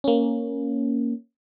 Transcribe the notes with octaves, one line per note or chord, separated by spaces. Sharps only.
A#3 C#4